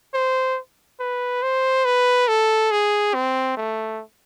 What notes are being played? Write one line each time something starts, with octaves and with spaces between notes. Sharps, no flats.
C5
B4
C5
B4
A4
G#4
C4
A3